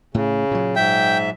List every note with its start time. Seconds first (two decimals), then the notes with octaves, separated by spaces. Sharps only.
0.14 A2 C#3
0.51 A#2 F#3
0.76 G#2 E5 G5